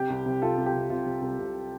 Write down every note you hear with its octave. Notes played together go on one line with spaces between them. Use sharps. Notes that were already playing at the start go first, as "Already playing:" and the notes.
Already playing: C3 G4
C2
C3
C2 F4 A4
C2
G4
C3
C3 F4
C3
C2
C3